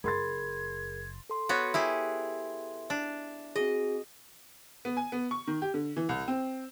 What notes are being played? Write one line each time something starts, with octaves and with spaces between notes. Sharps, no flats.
F#1 G#4 A#4 B5 C6 G#6 A6
A4 C6
B3 F#4 C#5
E4 G4 G#4
D4
C4 F#4 G#4 D#5
B3
G#5
B3
C#6
D#3
G4
D3
E3
C2
C4